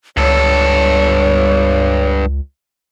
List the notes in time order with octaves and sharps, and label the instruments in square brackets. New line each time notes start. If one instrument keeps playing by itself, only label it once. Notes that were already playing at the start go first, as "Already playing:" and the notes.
[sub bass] C#2 [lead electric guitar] G2 A4 [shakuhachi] C#5